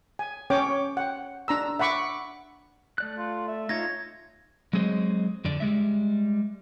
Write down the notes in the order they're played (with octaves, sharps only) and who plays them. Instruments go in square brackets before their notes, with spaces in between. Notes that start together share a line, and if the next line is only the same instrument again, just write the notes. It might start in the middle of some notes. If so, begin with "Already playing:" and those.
[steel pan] G#5
C#4 C#5 G5 D6
F#5 G5
D4 A#5 E6
E5 F#5 B5 C#6 D6
[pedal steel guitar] A3 D5 F#6
[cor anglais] F4
E5
[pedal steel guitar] D#4 F4 C#5 [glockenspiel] G#6 A#6
[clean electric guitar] F#3 G#3 C4 G#4 C5 D#5
F2 D3 D5
G3 G#3 E5